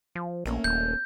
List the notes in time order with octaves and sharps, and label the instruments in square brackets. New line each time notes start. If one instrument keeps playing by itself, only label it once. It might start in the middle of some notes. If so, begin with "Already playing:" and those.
[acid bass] F3
[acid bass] A#1 [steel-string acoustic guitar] A3 A#3 C#4
[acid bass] D#1 [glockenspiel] G6